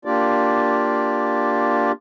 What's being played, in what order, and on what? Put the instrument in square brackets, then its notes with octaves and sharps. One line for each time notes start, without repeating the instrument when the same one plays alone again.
[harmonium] A#3 D4 F4 G4 D5